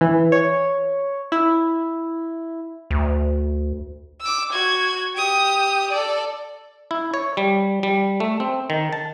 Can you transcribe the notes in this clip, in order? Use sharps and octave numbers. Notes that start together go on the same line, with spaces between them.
E3
C#5
E4
D2
D6 E6
F#4 G#6
G4 D#6
A4 D5
E4
C#5
G3
G3
A3
C4
D#3
A5